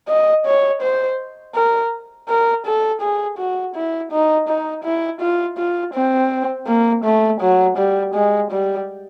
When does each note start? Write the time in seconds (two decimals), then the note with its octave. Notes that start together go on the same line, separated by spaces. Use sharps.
0.09 D#5
0.46 C#5
0.82 C5
1.55 A#4
2.29 A#4
2.66 A4
3.01 G#4
3.39 F#4
3.76 E4
4.12 D#4
4.48 D#4
4.84 E4
5.21 F4
5.58 F4
5.94 C4
6.67 A#3
7.05 A3
7.41 F#3
7.77 G3
8.15 G#3
8.51 G3